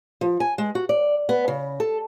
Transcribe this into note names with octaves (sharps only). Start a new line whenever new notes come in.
F3
G#5
G#3
F#4
D5
B3
C#3
A4